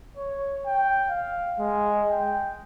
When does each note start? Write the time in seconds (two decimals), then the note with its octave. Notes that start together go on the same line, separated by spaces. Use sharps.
0.17 C#5
0.66 G5
1.10 F5
1.59 G#3
2.11 G5